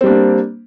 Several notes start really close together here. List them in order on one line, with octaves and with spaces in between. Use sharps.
C4 G3 D4 A#3